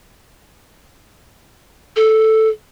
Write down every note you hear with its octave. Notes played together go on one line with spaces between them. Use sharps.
A4